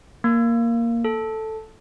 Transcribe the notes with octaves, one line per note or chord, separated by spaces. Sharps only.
A#3
A4